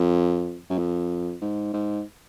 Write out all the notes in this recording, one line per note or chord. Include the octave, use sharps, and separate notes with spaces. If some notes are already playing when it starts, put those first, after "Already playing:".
Already playing: F2
F#2
F2
G#2
G#2